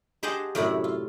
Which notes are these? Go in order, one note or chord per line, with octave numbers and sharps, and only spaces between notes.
G4 G#4 C5 D#5 F#5 A5
F#2 A2 C3 E4 D5 B5
F4